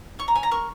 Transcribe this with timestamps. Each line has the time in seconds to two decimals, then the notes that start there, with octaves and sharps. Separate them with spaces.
0.19 C#5 C#6
0.28 A#5
0.35 C#5 G#5
0.43 A#5
0.51 A#4 C#6